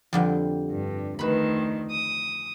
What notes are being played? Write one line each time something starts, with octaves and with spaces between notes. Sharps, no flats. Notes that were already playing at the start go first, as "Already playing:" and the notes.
F2 D3 G3
G2
D2 D#3 B4 B5
D#6